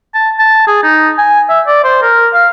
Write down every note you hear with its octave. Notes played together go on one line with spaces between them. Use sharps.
A5
A5
G#4
D#4
G#5
E5
D5
C5
A#4
F5